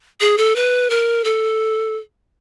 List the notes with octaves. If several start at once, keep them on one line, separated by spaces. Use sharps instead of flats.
G#4
A4
B4
A#4
A4